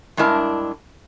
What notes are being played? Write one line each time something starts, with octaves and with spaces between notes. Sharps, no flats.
G2 G#3 D4 E4 A#4 A5